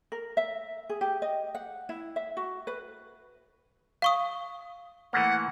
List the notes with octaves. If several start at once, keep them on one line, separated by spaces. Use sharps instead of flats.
A#4
E5
G#4
G4
D#5
F#5
E4
E5
F#4
B4
F5 C#6 D#6
E3 A3 A#3 F#5